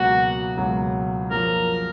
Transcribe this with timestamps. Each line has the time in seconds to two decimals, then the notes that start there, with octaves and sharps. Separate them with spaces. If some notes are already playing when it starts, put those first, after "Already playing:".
Already playing: C#2 B2 F#3 A#3 F#4
0.57 C#2 B2 F#3 A#3
1.31 F#2 F3 A#3 A#4